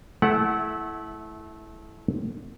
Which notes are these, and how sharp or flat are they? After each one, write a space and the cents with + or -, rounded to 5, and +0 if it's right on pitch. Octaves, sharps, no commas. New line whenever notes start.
A3 -25 E4 +0 F#5 +0